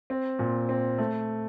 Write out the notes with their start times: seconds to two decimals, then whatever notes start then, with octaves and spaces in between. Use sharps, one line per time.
0.10 C4
0.39 A#2
0.69 C4
0.98 A3